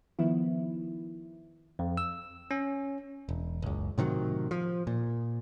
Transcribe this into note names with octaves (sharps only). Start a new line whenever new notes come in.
D#3 F3 B3 E4
F2
E6
C#4
E1
F#1 C#2
A2 C3 D#3 F#3
F3
A#2